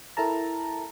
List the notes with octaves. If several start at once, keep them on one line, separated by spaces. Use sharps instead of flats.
E4 A4 A#4 A5 A#5